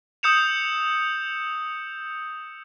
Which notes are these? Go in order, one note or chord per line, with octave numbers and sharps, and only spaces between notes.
D#6 E6 G6 C#7 E7 F7